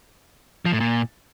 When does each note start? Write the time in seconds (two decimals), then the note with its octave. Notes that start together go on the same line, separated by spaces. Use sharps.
0.65 F3
0.73 A2
0.80 A#2